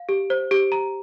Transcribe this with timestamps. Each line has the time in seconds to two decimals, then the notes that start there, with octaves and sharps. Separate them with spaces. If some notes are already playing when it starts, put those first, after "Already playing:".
Already playing: F5
0.09 G4
0.30 C5
0.51 G4
0.72 A#5